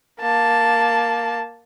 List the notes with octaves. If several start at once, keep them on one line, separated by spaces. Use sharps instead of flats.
A#3 A5